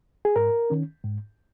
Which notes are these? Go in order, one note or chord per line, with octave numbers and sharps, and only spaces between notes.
G#4
G#2 A#4
D#3 C#4
G#2